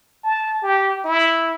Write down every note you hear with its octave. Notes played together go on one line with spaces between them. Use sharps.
A5
G4
E4